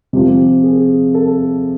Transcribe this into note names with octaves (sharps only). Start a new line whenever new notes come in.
C3 F3 G4
G#4
A4